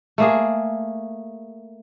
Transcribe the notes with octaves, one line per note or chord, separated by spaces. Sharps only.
A3 A#3 G#4